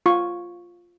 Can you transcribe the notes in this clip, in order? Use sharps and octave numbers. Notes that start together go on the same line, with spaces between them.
F4 C#6